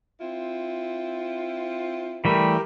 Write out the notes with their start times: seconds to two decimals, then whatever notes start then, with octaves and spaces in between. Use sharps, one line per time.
0.19 C4 E4 F4
2.25 E3 G3 A3 G4 A#4 B5